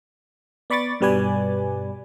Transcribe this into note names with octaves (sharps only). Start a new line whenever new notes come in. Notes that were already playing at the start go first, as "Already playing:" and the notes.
B3 D5 B5 C#6 D6 A6
G2 B2 G3 B4 D5 G#5